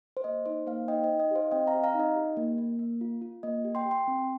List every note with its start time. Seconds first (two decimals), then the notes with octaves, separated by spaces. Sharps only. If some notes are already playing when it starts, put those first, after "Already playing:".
0.17 C5
0.24 A#3 D#5
0.46 D#4 C5
0.67 A#3 C5 F5
0.88 D#4 D#5 G5
1.04 D#5
1.09 D#4
1.20 D#5
1.31 G4 C5 F5
1.51 C4 D#5 G5
1.67 F5 A#5
1.74 G4
1.84 F5 A#5
1.94 D#4
1.99 D#5
2.16 G4
2.37 A#3
2.58 A#3
2.79 A#3
3.01 F4
3.22 F4
3.43 A#3 D#5
3.65 G4
3.75 G5 C6
3.86 G4
3.91 G5 C6
4.07 C4